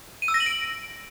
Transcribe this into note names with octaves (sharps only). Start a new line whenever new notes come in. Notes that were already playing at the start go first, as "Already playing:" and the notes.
D#7
E6
A#6
F#7
D7